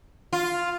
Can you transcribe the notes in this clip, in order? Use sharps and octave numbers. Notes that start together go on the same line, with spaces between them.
F4